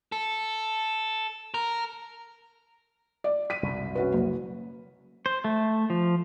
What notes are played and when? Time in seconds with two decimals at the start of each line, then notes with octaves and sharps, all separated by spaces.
0.12 A4
1.54 A#4
3.24 D5
3.50 B6 D#7
3.63 C2 F#2 B2
3.95 C#4 F#4 B4
4.13 F#1
5.26 C5
5.44 A3
5.90 F3